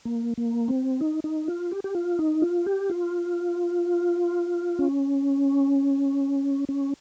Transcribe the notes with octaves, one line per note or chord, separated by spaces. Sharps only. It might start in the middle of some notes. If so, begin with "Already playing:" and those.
A#3
A#3
C4
D#4
D#4
F4
G4
G4
F4
D#4
F4
G4
F4
C#4
C#4